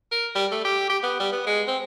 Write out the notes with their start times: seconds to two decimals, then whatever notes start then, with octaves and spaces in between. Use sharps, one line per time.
0.12 A#4
0.35 G3
0.52 A3
0.65 G4
0.90 G4
1.03 B3
1.20 G3
1.33 B3
1.47 G#3
1.68 C4